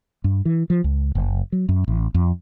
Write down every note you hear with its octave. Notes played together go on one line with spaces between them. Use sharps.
G2
E3
F3
C#2
F#1
F#3
F#2
A1
F2